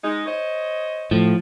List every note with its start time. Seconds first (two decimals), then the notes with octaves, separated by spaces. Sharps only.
0.04 G#3 D#4
0.26 C5 C#5 D#5
1.11 A2 F3